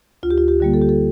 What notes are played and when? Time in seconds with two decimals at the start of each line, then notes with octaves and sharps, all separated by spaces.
0.23 D2 F4
0.31 G4
0.38 F4
0.48 G4
0.60 D3 G3 A#3
0.74 A4
0.81 G4
0.89 A4